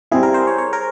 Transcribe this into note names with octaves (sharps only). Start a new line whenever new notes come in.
G3 C4 E4 G#4
A#4
C5
C#5
C#5
A#4